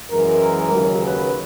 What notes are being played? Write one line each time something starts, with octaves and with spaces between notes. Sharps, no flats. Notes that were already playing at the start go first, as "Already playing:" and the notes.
F#2 E3 G#3 A#4
D#2 C#3 F#3
B4